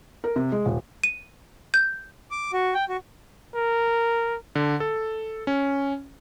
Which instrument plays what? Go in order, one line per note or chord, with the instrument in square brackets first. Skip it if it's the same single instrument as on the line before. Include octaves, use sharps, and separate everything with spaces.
[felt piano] A#4
C3
G#3
D#1
[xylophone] D#7
G6
[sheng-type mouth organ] D6
F#4
G5
F#4
[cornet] A#4
[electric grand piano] D3
A4
C#4